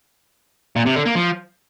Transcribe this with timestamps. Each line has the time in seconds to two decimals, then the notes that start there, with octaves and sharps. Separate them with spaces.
0.76 A#2
0.86 C3
0.96 D3
1.06 A#3
1.16 F3